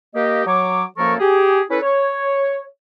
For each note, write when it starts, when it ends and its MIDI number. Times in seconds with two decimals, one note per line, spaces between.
0.14 0.43 58
0.14 0.43 67
0.14 0.43 75
0.46 0.84 54
0.46 0.84 73
0.46 0.84 86
0.97 1.14 42
0.97 1.14 53
0.97 1.14 58
0.97 1.14 69
0.97 1.14 70
0.97 1.14 85
1.19 1.61 67
1.19 1.61 68
1.70 1.78 61
1.70 1.78 64
1.70 1.78 69
1.70 1.78 71
1.82 2.64 73